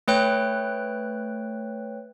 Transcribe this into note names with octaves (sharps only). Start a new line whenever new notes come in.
A3 B4 C#5 G5 F#6